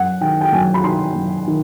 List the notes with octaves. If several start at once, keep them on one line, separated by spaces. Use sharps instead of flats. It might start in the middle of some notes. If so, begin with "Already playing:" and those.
Already playing: F#2 F#5
D#3 G5
G5
F#2 G#5
B5
D#3 C6
F#2
D#3